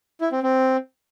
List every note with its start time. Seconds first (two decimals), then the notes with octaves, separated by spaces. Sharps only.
0.21 E4
0.32 C4
0.43 C4